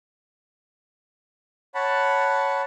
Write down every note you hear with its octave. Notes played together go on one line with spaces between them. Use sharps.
C#5 F#5 A5 B5